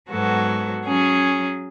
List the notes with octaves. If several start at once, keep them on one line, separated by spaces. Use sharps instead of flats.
G#2 F#3 B3 F#4 A4
F#3 C#4 G#4